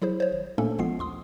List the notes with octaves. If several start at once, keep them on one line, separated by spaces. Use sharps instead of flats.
F#3 E4 G#4 C5
C5 C#5
G#1
A#2 A3 A#3 C#4 D4 A4
A1 F3 G#3 B3 F4 C7
D#2 C6 D#6